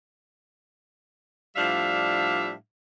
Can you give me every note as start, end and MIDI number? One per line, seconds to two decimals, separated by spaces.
1.56 2.53 45
1.56 2.53 53
1.56 2.53 55
1.56 2.53 62
1.56 2.53 76
1.56 2.53 77